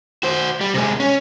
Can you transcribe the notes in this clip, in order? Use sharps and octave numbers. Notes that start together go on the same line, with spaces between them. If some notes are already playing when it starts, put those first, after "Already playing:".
F#4 C5
G3
C3 G#3
C#4